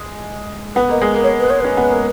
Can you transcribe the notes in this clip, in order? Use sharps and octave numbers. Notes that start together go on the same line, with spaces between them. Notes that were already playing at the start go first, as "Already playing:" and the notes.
Already playing: G#3
B3 B4
A#3 D#5
G#3
A#3
C#5
B4
C#5
C#4 B4
B3
A#3